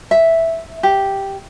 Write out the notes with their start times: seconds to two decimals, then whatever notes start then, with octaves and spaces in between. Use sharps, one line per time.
0.11 E5
0.83 G4